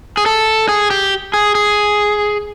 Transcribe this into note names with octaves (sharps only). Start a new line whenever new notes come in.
G#4
A4
G#4
G4
G#4
G#4